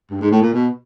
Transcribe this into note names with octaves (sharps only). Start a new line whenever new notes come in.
G2
G#2
A2
A#2
B2